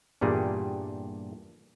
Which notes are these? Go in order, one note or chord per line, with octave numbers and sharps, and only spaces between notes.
E2 G2 A#2 G3 G#4